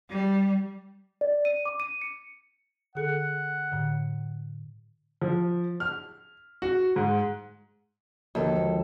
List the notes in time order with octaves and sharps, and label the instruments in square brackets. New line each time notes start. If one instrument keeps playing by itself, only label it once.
[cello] G3
[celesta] D5
D#7
D6
D#7
C#7
[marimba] D3 G#4 A4 [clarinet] F#5
[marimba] A2 D3
[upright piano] F3
F6
F#4
G#2
[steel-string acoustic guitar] D#2 A4 [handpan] D3 F3 F#4
[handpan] F3 G#3